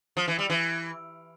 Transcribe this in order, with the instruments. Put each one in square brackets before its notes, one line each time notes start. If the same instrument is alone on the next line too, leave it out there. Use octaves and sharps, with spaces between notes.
[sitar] F3
E3
G3
E3